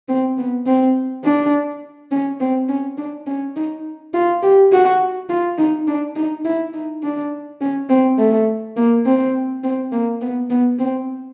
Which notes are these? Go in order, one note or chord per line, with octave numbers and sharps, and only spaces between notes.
C4
B3
C4
D4
C#4
C4
C#4
D4
C#4
D#4
F4
G4
F#4
F4
D#4
D4
D#4
E4
D#4
D4
C#4
C4
A3
A#3
C4
C4
A#3
B3
B3
C4